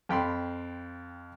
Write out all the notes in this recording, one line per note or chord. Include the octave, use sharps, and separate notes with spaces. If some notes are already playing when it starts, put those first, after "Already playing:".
F2 G5 B5 C6